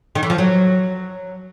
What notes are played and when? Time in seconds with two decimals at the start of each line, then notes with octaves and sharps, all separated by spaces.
0.15 D#3
0.23 E3
0.30 F3
0.38 F#3